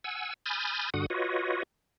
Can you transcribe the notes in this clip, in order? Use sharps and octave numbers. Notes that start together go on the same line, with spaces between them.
F#5 G#5 E6
G#5 B5 D#6 F6 G6 A6
G2 D3 F#4 F#5 D#6
F4 F#4 B4 C#5 D#5